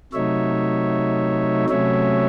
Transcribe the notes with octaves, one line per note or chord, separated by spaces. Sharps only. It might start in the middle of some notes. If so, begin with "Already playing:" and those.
C3 F#3 A3 D#4 C#5 E5
C3 F#3 A3 C#4 C#5 E5